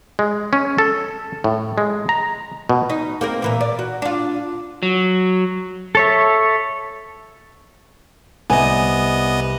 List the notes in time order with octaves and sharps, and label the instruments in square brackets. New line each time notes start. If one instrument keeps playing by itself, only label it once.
[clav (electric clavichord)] G#3
C#4
A4
A2
G#3
A#5
B2
[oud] D#4
A#3 C4 A#4
A#2 E3 A#3
D5
F#4
D4 F4
[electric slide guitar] F#3
[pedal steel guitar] A4 C#5 E5
[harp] C2 [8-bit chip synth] B3 D#5 [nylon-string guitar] G#5